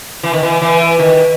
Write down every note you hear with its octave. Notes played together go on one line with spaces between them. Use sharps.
E3
D#3
E3
E3
D#3